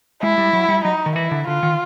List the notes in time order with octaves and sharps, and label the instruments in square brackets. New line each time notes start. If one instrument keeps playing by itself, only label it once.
[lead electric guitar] G#3 [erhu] E4
[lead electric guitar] G3
F#3
G3
[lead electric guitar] F#3 [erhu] D#4
[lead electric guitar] D#3
[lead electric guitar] E3 [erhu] E4
[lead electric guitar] D3
[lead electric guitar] D3 [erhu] F4
[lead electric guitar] D#3